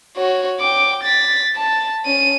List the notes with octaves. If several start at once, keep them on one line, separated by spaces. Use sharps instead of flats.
F#4 C#5
G5 D6
A6 B6
A5
C#4 D#7